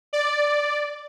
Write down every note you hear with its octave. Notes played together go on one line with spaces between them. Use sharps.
D5